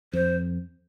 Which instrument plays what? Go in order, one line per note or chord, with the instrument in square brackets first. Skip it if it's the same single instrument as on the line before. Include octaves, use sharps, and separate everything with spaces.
[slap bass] F2 [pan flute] C5